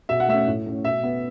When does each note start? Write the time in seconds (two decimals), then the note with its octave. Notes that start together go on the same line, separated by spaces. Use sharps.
0.09 B2 E5
0.20 F#5
0.28 A3 C#4 E5
0.47 A2
0.66 A3 C#4
0.85 B2 E5
1.03 B3